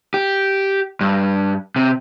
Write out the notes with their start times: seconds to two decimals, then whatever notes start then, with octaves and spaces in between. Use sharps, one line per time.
0.14 G4
1.01 G2
1.76 C3